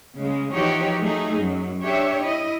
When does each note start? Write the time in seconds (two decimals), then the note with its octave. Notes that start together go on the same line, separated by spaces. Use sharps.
0.19 C#3 G#3
0.54 E3 F3 D#4 F#4 G4 C#5
1.01 F#3 A3 D#4 G#4
1.38 F#2 F#3
1.81 D4 G4 C#5 E5
2.21 E4 D#5